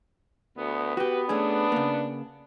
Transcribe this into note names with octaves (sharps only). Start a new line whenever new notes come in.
D2 B3
F#4 G4 B4
A3 C#4 D4 G#4
C#3 A#3